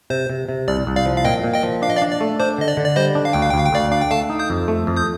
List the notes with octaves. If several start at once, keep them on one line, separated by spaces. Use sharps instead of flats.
C3 C5
C3
C3
C2 D5
C2
D5 F5
F3
F5
A#2 D#5 G5
A#2
D#5 G5
F3
D4 F5
D#5
D5 F5
D4
D5
A3
D4 C5
D3 D#5
D5
D3
D5
G3 C5 D#5
D4
F5
D2 G5
F5
G5
D2 F5
G5
D2 D5 F5
D4 F5
G5
A3 F5 A5
D#4
D#6 G6
F2
A3
F2
D#6 G6